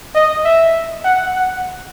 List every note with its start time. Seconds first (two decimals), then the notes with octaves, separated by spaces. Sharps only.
0.15 D#5
0.45 E5
1.05 F#5
1.36 F#5